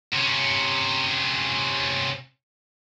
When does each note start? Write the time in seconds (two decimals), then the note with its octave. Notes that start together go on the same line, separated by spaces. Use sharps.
0.13 C3 C#4